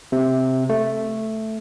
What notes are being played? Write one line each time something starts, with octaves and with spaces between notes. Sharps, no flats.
C3
A3